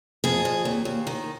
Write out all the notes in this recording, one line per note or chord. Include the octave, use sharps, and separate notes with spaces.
F2 G#4
F2
D#2
D#2
D#3